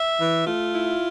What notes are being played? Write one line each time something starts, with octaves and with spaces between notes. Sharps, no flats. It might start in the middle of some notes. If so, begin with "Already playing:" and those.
Already playing: E5
E3
A3 F4
E4